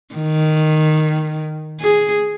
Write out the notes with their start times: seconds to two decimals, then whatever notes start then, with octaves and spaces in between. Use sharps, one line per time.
0.15 D#3
1.80 G#4